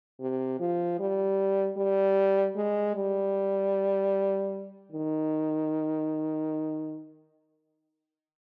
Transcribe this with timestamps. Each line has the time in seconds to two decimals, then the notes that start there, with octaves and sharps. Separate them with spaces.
0.20 C3
0.60 F3
0.99 G3
1.77 G3
2.56 G#3
2.95 G3
4.92 D#3